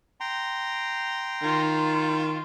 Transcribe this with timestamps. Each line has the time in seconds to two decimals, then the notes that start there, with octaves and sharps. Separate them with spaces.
0.20 G5 A#5 C6
1.42 D#3 F4